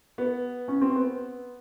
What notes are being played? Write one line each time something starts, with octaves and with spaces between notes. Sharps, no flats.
B3
C#4
C4
B3